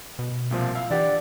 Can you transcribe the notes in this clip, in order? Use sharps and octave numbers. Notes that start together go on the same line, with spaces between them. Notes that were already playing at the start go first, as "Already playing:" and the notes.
B2
C2 A#2 F3
E4 F5
E3 D4 G4 D5 F#5